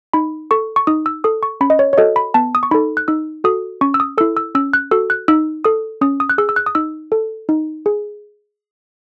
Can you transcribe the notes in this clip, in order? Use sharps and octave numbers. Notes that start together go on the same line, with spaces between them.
D#4 B5
A4 C#6
C#6
D#4 D#6
E6
A4 D#6
C#6
C#4 B5
D#5
C#5
C#5
F#4 A4 D#5
B5
B3 A5
D#6
C#6
D#4 A4 B5
F#6
D#4 E6
F#4 A4 D#6
C#4 C#6
E6
D#6
E4 A4 E6
E6
C#4 E6
F#6
F#4 A4 E6
F#6
D#4 E6
A4 D#6
C#4 D#6
D#6
F#6
G#4 E6
E6
F#6
D#6
D#4 E6
A4
D#4
G#4